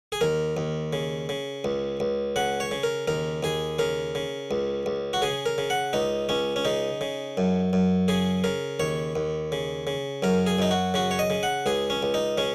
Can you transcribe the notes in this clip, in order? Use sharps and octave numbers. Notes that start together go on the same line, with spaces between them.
G#4
D#2 A#4
D#2
C#3
C#3
C#2
C#2
C#3 F#5
C#5
C#3
A#4
D#2 A#4
D#2 G#4
C#3 A#4
C#3
C#2
C#2
F#4
C#3 G#4
A#4
C#3
F#5
C#2 D#4
C#2 C#4
C#4
C#3 D#4
C#3
F#2
F#2
C#3 G#4
C#3 A#4
D#2 C#5
D#2
C#3
C#3
F#2 A#4
G#4
F#2 D#4
F#4
C#3 F#4
C#5
D#5
C#3
F#5
C#2 G#4
C#4
C#2
D#4
C#3 C#4